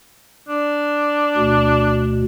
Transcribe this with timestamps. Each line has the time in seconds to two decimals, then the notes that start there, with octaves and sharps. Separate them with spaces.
0.49 D4
1.37 D2 B2